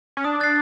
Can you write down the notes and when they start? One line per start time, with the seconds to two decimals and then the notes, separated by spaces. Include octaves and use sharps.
0.17 C#4
0.24 D4 D#6
0.40 F#6 A6 C7